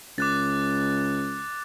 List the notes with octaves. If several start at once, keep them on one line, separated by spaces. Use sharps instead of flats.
C#2 D6 F#6 A6